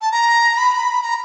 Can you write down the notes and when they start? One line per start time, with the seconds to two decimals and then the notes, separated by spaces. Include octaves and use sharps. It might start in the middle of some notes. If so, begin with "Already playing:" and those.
0.01 A5
0.12 A#5
0.57 B5
1.03 A#5